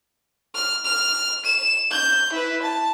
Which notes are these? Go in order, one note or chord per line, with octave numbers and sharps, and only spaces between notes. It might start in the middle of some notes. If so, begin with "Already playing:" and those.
F6
F6
E7
G6
E4 B4
A5